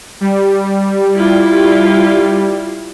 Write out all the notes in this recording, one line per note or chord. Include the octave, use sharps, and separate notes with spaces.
G3
E4 F4